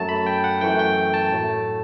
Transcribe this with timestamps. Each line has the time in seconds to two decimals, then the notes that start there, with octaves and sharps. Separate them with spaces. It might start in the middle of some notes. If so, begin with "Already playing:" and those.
Already playing: F#2 F#3 A3 A5
0.09 B5
0.26 G5
0.44 F#5
0.61 F#2 E3 A3 G5
0.79 G5
1.14 A5
1.31 A2 F#3 A3